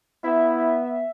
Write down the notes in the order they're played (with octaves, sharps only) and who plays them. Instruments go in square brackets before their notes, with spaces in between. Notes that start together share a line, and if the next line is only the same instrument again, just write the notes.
[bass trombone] B3 [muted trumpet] E4 [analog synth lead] E5